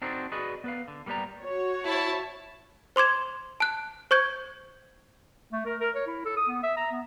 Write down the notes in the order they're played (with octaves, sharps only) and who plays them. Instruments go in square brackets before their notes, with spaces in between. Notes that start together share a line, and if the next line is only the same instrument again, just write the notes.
[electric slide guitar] C4 D4 D#4 F#4 A4 C5
F#4 G#4 B4 D5 D#5
B3 B4 F5
D3
G3 A#3 B3 G4 D5 A#5
[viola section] F#4 C#5
[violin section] E4 A5
[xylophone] C5 C6 D6 G#6 E7
A5 F#6
C5 C#6 G6 G#6
[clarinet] A3
A#4
A#4
C#5
E4
A4
D#6
B3
E5
A#5
B3